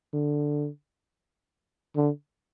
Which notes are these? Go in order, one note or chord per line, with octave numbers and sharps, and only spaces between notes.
D3
D3